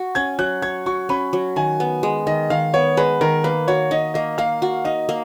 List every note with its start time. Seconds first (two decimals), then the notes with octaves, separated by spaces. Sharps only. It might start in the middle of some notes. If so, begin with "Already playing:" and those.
Already playing: F#4
0.15 C#4 G#6
0.39 F#3 F#6
0.62 C#5 G#6
0.86 F#4 C#6
1.09 C#4 B5
1.33 F#3
1.56 D#3 G#5
1.80 B3
2.03 G#3
2.27 D#3 D#5
2.50 D#3 F5
2.74 B3 C#5
2.97 G#3 B4
3.21 D#3 A#4
3.44 A#3 B4
3.68 F#4 C#5
3.91 D#4 D#5
4.14 A#3 D#5
4.38 A#3 F5
4.62 F#4
4.85 D#4 D#5
5.09 A#3